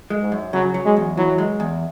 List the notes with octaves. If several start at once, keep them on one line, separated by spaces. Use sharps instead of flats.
G#3
G#2
F#2
C#3 F#3
F#3
G#3
E2
E3 F#3
G#3
E2